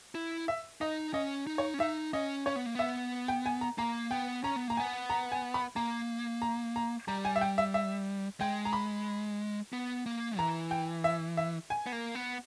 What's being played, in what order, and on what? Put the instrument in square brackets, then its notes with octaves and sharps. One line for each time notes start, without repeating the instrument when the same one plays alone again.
[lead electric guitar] E4
[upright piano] E5
[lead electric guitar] D#4 [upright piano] D#5
[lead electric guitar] C#4 [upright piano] D#5
[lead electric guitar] D#4
[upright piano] C#5
[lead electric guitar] C#4
[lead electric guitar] D#4 [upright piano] E5
[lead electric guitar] C#4 [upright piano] D#5
[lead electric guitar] C#4 [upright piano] C#5
[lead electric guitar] B3
A#3
[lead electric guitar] B3 [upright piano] E5
[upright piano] G5
G#5
A#5
[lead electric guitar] A#3 [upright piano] A#5
[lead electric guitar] B3 [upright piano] G5
[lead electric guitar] C#4 [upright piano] A#5
[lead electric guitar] B3
[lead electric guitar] A#3 [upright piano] A#5
[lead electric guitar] B3 [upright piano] G#5
[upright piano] A#5
G#5
B5
[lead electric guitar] A#3 [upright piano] A#5
[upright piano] A#5
A#5
[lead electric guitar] G3 [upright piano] A#5
[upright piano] G#5
E5
G5
E5
E5
[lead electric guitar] G#3 [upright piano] G5
[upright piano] A#5
B5
[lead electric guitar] B3
A#3
[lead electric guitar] E3 [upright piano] A#5
[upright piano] G5
E5
E5
G#5
[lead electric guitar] B3
A#3
B3